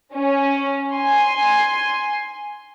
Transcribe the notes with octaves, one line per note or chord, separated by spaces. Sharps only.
C#4
G#5 C6